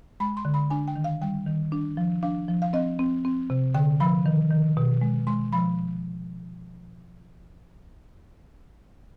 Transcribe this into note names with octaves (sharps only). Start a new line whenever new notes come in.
G#3 B5
C6
D3
B5
D4 G#5
G5
D#3
F5
G3 G5
D#3
D4
F3
D4 F5
F3
F5
C4 D#5
C4
C4
C3
D3 G5
F3 B5
D#3
D#3
B2
G#3
G#3 C6
F3 B5